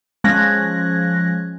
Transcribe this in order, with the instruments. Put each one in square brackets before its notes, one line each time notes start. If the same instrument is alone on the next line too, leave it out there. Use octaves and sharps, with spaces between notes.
[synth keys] F3 G#3 C#4 F#6 G#6 A#6